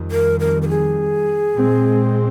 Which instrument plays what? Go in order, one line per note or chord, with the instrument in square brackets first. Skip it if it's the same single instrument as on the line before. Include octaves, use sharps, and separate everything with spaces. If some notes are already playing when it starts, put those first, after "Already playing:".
Already playing: [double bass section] F2 D#3 G3
[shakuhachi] A#4
A#4
A#4
G#4
[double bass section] A#2 G#3 C4